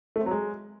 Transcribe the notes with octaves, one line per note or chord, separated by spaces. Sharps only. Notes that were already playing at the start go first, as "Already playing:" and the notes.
A3
C4
F#3
G#3